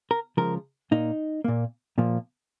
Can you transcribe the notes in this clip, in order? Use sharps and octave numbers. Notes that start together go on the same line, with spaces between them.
A#4
C#3 F3 G#3 A#4
A#2 A#3 D#4
A#2 A#3
A#2 F3 A#3